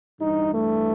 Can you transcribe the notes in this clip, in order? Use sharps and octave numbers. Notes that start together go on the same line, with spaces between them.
G2 E3 G3 D#4
A3